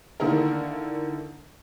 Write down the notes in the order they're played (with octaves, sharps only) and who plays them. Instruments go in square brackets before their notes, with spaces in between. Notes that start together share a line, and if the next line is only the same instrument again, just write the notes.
[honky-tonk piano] D3 D#3 A#3 E4 A#4